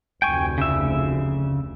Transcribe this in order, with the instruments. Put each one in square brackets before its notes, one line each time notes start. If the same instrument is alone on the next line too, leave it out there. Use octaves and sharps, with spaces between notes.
[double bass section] F1 D2 [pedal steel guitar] G5 G#5 C#6
[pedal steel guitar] C#3 E5